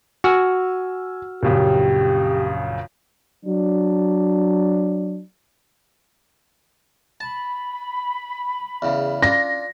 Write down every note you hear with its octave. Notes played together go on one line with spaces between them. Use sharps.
F#4 G#5 E6 F6
A#1 F#2 C#3 G4
F#3 D4
A5 B5
E2 C#3
D4 F4 A#6